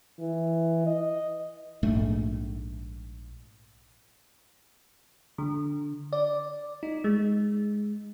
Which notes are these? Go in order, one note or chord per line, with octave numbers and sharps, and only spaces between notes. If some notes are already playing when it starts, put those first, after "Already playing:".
E3
D#5
A#1 G#2 A3
D3
D5
D#4
G#3